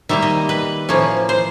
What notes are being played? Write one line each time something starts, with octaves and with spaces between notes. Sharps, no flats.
D#3 G3 A#3 E5
D#5
B4
A2 F3 A#3 C#4
C5